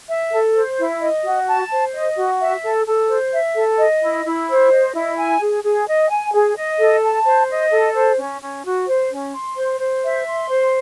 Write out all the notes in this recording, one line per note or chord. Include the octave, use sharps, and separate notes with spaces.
E5
A4
C5
E4
D#5
F#4
A5
C5
D#5
F#4
E5
A4
A4
C5
E5
A4
D#5
E4
E4
C5
D#5
E4
G#5
G#4
G#4
D#5
G#5
G#4
D#5
A4
A5
C5
D#5
A4
C5
C#4
C#4
F#4
C5
C#4
C6
C5
C5
E5
C6
C5